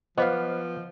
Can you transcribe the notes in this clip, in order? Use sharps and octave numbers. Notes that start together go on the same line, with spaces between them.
F3 B3 B4 C5 D#5 F5 D6